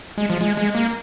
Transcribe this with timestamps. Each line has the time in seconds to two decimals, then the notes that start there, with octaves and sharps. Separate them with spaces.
0.18 G#3
0.30 F3
0.41 G#3
0.57 G#3
0.75 A#3